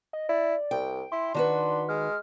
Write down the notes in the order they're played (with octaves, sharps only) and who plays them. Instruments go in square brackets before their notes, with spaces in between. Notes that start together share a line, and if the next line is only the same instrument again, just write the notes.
[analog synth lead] D#5
[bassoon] E4 [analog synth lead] D5
[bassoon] C2 [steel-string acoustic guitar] G5
[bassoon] E4 [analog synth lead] C6
[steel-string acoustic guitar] D#3 F#4 B4 [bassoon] D4
[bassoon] G#3 [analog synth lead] F6